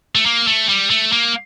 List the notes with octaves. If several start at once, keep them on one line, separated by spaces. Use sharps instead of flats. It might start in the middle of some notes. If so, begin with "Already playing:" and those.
A3
A#3
A3
G3
A3
A#3